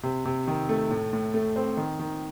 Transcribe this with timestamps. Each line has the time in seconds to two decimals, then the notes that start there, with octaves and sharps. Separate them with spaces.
0.03 C3
0.25 C3
0.47 D#3
0.69 A3
0.90 A2
1.13 A2
1.34 A3
1.56 C4
1.77 D#3
1.99 D#3